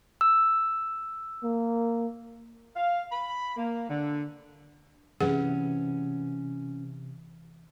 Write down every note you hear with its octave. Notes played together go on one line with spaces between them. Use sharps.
E6
A#3
F5
B5
A#3
D3
C3 E3 C#4 G#4 B4 F#5